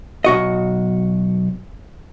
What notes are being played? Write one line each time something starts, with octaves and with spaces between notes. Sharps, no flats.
B1 F#4 D#5